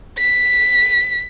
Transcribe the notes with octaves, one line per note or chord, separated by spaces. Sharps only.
B6